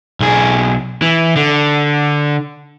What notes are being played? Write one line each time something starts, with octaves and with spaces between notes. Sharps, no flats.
B1 G#4
E3
D3